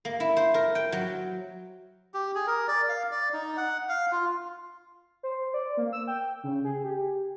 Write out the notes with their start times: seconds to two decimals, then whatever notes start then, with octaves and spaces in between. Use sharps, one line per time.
0.05 A#3
0.20 E4
0.37 C5
0.54 A#4
0.75 G5
0.92 F#3
2.14 G4
2.35 G#4
2.47 A#4
2.68 D5
2.89 F5
3.11 D5
3.33 D#4
3.57 F#5
3.89 F5
4.12 F4
5.23 C5
5.54 D5
5.77 A#3
5.93 E6
6.07 G5
6.43 C#3
6.64 G#4
6.84 G4